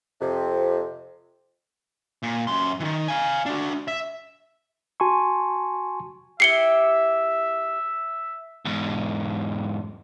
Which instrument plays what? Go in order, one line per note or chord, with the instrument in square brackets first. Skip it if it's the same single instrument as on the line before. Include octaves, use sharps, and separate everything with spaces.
[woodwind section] F2 C3
[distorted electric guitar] A#2
F#2 C6
D#3 E3
F5 G#5
D4 F#4
E5
[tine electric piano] F#4 G#5 A5 C6 C#6
[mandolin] E4 G4 [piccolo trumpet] E5 [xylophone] C7 C#7 G7
[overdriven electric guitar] E2 G#2